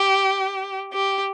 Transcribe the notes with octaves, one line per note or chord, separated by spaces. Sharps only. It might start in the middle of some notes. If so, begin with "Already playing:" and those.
Already playing: G4
G4